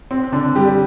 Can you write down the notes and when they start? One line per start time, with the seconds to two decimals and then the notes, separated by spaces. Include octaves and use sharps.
0.11 C4
0.32 D3 D4
0.55 G3 G4